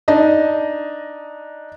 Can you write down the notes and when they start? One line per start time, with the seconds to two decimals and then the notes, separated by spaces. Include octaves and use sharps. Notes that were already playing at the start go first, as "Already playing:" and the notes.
0.08 D4 D#4 D#5